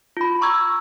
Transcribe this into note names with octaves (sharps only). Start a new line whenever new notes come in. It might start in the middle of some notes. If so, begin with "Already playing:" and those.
F4 B5
A#5 C#6 E6 G#6